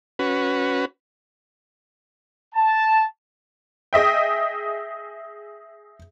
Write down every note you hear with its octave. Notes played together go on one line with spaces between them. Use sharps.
C#4 F#4 B4
A5
G#4 D#5 E5 G5